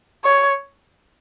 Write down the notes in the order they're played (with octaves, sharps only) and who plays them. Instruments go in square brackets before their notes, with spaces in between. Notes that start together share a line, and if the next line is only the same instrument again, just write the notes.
[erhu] C#5